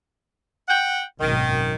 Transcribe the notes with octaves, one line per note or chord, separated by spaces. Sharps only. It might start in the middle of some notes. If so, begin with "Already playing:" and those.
F#5 G5
G#1 F#2 B2 D#3